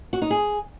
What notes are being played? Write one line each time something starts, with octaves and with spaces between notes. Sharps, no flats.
F#4
D#4
G#4